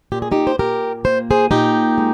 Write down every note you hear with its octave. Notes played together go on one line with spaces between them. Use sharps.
A#2 G4
G#4
D#4 G4
C5
A#2 G4 A#4
A#3 C5
G#4 C5
A#2 D#4 G4
G#3